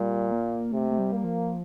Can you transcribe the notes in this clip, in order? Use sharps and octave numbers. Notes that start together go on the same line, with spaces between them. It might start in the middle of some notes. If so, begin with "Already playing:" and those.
Already playing: A#2 G3
A#3
C3 A3
A3
G3
A#3
F3